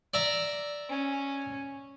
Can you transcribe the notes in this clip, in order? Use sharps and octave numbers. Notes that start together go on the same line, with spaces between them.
D5 E5 A#5
C#4